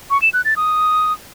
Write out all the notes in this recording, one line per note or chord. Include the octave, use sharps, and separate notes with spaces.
C#6
E7
F#6
A6
D#6